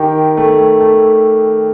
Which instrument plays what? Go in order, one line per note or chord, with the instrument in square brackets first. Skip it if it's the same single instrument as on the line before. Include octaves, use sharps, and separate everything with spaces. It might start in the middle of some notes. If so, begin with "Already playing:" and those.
Already playing: [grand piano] D#3 G4
A3
A3